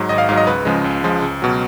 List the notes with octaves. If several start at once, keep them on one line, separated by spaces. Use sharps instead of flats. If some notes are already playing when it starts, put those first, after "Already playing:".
Already playing: G#2 F#3
G#1 D#5
F5
G#2 F#3 F5
D#5
C#2 B4
C#3 F3 G#3
C#2
C#3 F3 G#3
C#2
B2 F#3